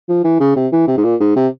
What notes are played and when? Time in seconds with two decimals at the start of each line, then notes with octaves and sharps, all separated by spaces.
0.09 F3
0.24 E3
0.40 C#3
0.56 C3
0.72 E3
0.88 C3
0.97 G#2
1.04 A#2
1.20 G#2
1.36 C3